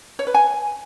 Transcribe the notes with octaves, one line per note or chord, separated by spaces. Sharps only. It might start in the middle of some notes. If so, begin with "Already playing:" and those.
C#5
B4
G#5